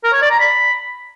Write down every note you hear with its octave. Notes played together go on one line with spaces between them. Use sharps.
A#4
C#5
D5
A#5
B5